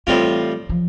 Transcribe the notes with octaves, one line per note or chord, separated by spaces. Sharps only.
A2 E3 G3 C4 F4
F3